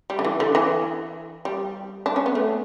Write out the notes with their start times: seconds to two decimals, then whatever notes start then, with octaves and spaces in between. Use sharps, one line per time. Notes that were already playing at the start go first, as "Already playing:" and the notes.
0.10 G3
0.19 D3
0.25 E3
0.40 D3
0.55 E3
1.45 G3
2.06 D4
2.16 C#4
2.26 B3
2.35 A3